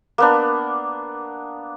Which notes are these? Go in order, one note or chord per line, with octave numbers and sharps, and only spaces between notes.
A#3 B3 D4